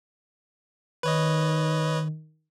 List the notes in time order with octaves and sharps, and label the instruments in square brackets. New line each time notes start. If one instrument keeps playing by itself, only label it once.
[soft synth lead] D#3 [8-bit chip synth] B4 C#5 D#5